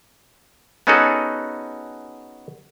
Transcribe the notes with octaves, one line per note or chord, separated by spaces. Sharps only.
B3 C#4 D#4 F#4 G#4 A4